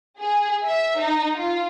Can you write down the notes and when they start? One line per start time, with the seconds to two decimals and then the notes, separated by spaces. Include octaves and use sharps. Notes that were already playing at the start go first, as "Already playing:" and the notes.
0.19 G#4
0.65 E5
0.99 D#4
1.36 F4